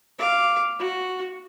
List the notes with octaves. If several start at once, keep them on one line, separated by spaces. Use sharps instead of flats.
F5 D6
F#4